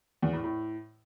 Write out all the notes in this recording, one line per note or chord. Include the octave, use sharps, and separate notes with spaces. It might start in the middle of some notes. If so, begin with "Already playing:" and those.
E2
A2
A2